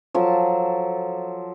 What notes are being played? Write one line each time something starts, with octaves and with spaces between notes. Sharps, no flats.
F3 F#3 A4 A5